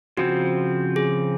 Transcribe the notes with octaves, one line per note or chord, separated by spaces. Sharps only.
C#3 F3 C4 F#4
G#4